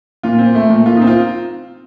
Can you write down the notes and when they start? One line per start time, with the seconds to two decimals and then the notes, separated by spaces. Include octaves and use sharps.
0.23 A#2 F4
0.39 C4
0.55 A3
0.70 A#2
0.85 A#2 F4
0.96 C4 D#4
1.07 F4